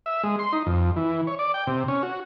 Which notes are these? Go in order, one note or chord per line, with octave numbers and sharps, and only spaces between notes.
E5
G#3
C6
D#4
F2
E3
C#5
D5
G5
C3
C#4
F#4